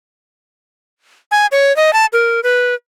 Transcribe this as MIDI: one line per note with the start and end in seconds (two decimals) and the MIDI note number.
1.31 1.46 80
1.52 1.75 73
1.76 1.93 75
1.93 2.06 81
2.13 2.40 70
2.43 2.74 71